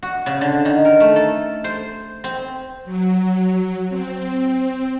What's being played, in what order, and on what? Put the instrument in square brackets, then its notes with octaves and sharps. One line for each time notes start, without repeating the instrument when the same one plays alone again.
[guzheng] F#4
C#3
D3
D#3
A#4
A3
A4
C5
C4
[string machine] F#3
C4